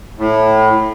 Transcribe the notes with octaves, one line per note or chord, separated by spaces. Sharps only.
A2